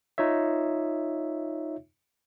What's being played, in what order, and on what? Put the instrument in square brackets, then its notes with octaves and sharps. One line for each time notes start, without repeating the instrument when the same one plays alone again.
[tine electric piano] D#4 F4 C#5 E5